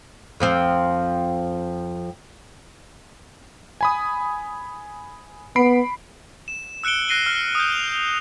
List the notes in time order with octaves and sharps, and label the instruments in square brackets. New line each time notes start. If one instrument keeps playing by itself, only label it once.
[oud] F2 F3 C4
[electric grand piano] G#5 B5 D#6
[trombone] B3 [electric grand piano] B5 C7 D7
[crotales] E7
E6 F#6 C#7 D7 G7
E6 F#6 A#6 C7 D#7 G7
F6
D#6 F6 G6
F7